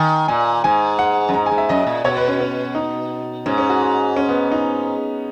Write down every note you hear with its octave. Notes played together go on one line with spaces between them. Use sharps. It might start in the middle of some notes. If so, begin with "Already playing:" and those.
Already playing: D#3 G#5
A#2 G#5
G#2 G#5
F#5
F#2
G#2 A#5
G#5
G#2
E5
F#2 D#5
A#2
B2 C#5
B4
C#4
C#4
D#4
G#2 C#4
C#4
F#4
F#4
C#4
B3
D#4